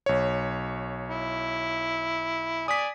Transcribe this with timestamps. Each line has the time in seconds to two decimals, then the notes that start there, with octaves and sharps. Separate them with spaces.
0.06 B1 C#5
1.08 E4
2.68 D5 G#5 D#6 B6